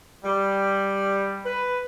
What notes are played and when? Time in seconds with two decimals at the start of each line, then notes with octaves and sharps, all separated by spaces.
0.24 G3
1.45 B4